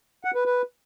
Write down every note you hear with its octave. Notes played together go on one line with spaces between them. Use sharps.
F#5
B4
B4